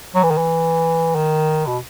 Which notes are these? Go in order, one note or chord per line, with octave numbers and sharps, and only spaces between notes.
F#3
E3
D#3
E3
D#3
B2